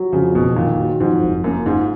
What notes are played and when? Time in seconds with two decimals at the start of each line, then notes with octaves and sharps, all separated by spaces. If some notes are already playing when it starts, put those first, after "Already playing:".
Already playing: F#3
0.13 F2 C#3
0.35 F#1 B2
0.56 A#2 D#3
0.79 F#3
1.00 F2 G#2
1.23 F#1
1.44 F#2 A#3
1.66 G#2 F4